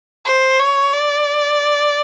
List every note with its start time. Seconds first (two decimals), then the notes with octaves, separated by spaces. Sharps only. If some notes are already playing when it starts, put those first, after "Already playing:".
0.25 C5
0.59 C#5
0.94 D5